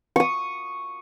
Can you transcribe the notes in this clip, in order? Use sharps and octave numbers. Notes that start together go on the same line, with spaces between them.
C#6 D#6